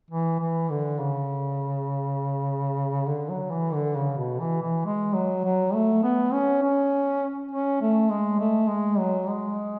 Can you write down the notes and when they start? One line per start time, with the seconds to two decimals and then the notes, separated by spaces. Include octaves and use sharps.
0.10 E3
0.40 E3
0.70 D3
0.99 C#3
3.07 D3
3.29 F#3
3.51 E3
3.74 D3
3.95 C#3
4.17 B2
4.40 E3
4.62 E3
4.85 G#3
5.14 F#3
5.44 F#3
5.74 A3
6.04 B3
6.33 C#4
6.63 C#4
7.51 C#4
7.81 A3
8.10 G#3
8.39 A3
8.69 G#3
8.99 F#3
9.29 G#3